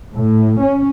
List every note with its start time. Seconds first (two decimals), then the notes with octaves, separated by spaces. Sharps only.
0.14 A2
0.60 C#4